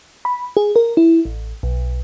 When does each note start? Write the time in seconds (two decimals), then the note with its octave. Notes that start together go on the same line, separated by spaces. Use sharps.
0.25 B5
0.57 G#4
0.76 A#4
0.97 E4
1.25 A1
1.63 B1